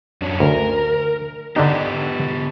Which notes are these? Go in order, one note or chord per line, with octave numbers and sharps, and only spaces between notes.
F#2 C#4 D4
D2 A#4
D3 B3 D4 D#4 G4